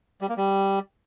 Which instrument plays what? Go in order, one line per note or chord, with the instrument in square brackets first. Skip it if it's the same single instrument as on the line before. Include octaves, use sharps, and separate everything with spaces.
[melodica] G3
A#3
G3